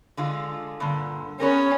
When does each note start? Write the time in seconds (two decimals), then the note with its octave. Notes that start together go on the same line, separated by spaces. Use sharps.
0.17 D3 G#3 F4
0.80 G2 A#2 D3
1.40 B3 C#4 G#4 A#4